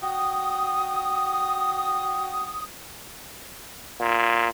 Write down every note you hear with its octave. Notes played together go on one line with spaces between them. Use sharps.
F#4 G5 D#6
A#2